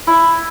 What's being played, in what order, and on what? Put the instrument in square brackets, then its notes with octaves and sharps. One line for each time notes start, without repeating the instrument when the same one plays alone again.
[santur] E4